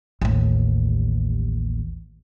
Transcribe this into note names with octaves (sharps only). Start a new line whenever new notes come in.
A1 D#2